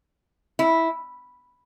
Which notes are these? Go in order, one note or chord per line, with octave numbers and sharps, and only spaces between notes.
E4